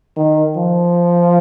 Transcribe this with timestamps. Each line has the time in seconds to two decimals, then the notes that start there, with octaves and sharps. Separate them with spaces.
0.17 D#3
0.56 F3